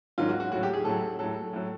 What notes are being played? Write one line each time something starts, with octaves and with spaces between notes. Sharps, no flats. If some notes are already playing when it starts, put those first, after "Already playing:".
G#2 D#3 F#3 F4
F#4
F#4
A2 F#3 F#4
G4
G#4
A2 F#3 A4
A2 F#3 A4
A2 F#3